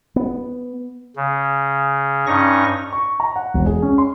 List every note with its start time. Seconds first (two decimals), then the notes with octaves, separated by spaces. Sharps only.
0.16 B3
1.17 C#3
2.27 G2 C#4 D#4 C#6 A#6
2.93 C#6
3.20 A#5
3.36 F#5
3.54 E1
3.66 G#4
3.82 C#4
3.98 C6